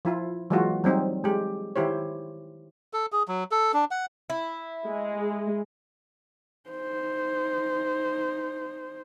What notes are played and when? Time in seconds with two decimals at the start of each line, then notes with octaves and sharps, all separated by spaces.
0.05 F3 E4 F4
0.50 E3 F#3 G#3 A#3 F4 F#4
0.84 F#3 G3 C4 D#4
1.24 G#3 G4
1.76 D#3 E4 G4 C5 C#5
2.93 A4
3.12 G#4
3.28 F#3
3.51 A4
3.74 D4
3.91 F#5
4.30 E4
4.87 G#3
6.70 D#4 C5